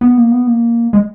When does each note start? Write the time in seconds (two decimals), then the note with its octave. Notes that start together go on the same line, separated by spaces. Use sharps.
0.01 B3
0.17 A#3
0.32 B3
0.47 A#3
0.93 G#3